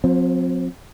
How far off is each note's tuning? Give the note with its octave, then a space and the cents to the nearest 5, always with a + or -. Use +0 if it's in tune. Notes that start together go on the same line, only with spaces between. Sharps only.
F3 +45 C4 -5